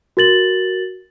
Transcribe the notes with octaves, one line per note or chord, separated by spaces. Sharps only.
F#4 A#4 A6 F#7